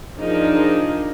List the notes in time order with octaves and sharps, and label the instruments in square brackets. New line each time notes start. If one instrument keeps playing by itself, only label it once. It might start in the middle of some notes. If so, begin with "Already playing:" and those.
[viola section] F3 D4 D#4 G#4 A#4